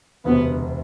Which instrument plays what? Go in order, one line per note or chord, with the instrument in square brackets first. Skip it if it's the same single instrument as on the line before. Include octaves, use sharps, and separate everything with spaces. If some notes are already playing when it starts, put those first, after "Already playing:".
[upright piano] E1 D2 C3 [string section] B3